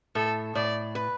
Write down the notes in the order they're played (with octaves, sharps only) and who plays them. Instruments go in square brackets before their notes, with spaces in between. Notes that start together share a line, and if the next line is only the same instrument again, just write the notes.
[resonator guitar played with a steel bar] A2 [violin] A4
[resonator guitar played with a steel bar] A2 [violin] D5
[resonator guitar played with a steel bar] B4